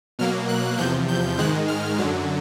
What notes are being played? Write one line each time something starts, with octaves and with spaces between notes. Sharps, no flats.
B2 F#3 A#3 F6
F#6
E2 C3 F3 G6
G6
G#2 D#3 G#3 F#6
F6
F#2 D3 F#3